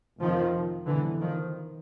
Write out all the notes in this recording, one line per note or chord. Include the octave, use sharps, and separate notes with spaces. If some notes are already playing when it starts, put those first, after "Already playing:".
F1 F2 C3 D#3 F3
C2 B2 D3 E3
D#3 F3